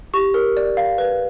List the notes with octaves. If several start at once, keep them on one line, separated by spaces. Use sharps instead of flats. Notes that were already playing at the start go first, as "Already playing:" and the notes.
G4 C#6
A#4
D5
F5
B4